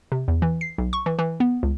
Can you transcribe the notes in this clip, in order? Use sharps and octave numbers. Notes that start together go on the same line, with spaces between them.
C3
E2
E3
C7
B1
C#6
E3
E3
B3
C#2